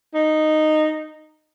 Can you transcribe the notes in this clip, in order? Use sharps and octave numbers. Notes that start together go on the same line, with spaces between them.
D#4